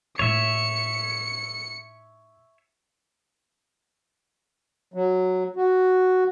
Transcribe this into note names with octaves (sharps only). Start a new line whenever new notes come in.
A2 D#4 C#5 E5 C#7
F#3
F#4